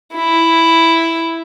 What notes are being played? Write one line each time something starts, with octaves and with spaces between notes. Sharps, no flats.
E4